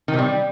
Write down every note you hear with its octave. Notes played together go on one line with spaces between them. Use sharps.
D#3
C3
G3